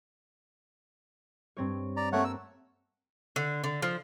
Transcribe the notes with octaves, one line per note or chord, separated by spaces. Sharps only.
G2 C4 C#5
D5 A#5
A3 A#3 C4 C#5 F#5
E6
D3
D3
F3